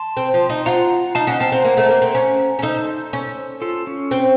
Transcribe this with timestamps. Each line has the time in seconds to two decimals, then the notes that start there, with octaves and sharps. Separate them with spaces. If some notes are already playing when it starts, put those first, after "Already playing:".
Already playing: A5 C6
0.17 C4
0.34 F3
0.49 D#4
0.66 F4 F#5 A#5
1.15 D#4 F5 A5
1.27 C#4 D#5 F#5
1.40 C4 F5 A5
1.52 C4 F#5 A#5
1.65 A#3
1.77 A3
1.89 A#3
2.02 C4
2.15 C#4
2.59 C#4
2.63 D#4 A4 C5
3.13 C#4
3.62 F4 A4
3.87 C#4
4.11 C4